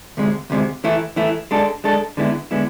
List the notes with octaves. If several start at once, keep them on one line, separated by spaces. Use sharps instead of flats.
D2 C3 G#3
D2 C3 G#3
E3 A3 E4
E3 A3 E4
G#3 D4 A4
G#3 D4 A4
D3 G#3 B3 E4
D3 G#3 B3 E4